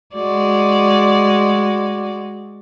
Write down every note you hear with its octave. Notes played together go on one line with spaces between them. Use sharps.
G#3 F#4 D5